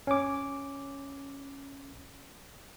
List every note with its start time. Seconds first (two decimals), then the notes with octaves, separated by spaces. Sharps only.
0.07 C#4 D6